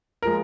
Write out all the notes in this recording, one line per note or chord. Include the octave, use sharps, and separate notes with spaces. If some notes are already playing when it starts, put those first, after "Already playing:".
F3 G#3 A#4